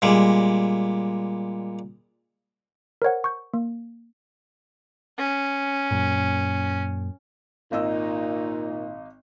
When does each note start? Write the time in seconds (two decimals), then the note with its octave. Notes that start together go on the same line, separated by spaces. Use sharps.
0.02 A#2 G3 G#3
3.02 A#4 C5 C#5 F#5
3.24 C#6 G6
3.54 A#3
5.18 C#4
5.91 F#2 A#2
7.72 G#1 A#2 D#4 D#5 E6